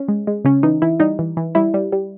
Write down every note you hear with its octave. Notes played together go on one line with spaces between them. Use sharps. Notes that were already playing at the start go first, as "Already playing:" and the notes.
Already playing: C#4
G#3
G#3
C#3 C#4
E3 D#4
E3 E4
G3 D#4
E3
E3
G3 E4
G3
G3